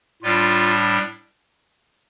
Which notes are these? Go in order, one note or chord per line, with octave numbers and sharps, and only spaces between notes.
A2 G3 D4 F4